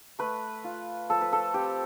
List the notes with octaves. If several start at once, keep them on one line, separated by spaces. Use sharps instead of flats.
A3 B4
F4
F3 A4
B4
A4
C4 G4